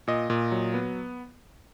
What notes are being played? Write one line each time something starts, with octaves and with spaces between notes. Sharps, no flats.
A#2 D#5
A#2
F#3
B3